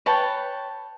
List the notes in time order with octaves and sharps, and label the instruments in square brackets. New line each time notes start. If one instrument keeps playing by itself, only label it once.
[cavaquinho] B4 C#5 G5 A5